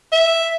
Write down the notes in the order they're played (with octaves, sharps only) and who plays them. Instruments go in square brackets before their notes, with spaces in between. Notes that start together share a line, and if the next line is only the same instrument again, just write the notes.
[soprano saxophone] E5